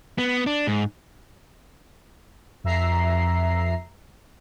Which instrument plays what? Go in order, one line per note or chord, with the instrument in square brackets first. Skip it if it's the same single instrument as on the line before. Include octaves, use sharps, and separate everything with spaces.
[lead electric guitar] B3
D4
G#2
[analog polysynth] F2 E5 A#5 C7